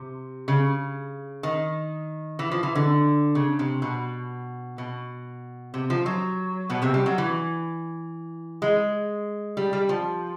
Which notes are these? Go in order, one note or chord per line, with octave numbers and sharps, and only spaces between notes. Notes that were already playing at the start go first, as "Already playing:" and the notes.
Already playing: C3
C#3
D#3
E3
F3
E3
D3
C#3
C3
B2
B2
C3
F3
F#3
B2 B3
C3 C4
G3
F#3
E3
G#3
G3
G3
F3